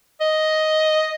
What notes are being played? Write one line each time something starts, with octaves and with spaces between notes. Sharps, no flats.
D#5